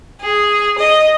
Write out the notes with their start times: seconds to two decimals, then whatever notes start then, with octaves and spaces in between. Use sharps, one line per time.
0.20 G#4
0.77 D#5